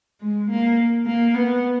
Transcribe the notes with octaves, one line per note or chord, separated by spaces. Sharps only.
G#3
A#3
A#3
B3